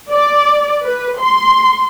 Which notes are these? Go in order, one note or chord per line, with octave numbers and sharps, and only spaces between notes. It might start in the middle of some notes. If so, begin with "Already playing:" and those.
D5
B4
C6